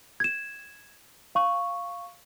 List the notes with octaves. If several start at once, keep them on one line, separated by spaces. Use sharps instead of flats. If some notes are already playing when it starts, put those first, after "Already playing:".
G#6 E7
F5 C#6